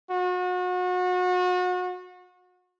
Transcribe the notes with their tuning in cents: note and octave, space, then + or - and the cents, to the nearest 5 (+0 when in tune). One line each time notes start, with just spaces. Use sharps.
F#4 -35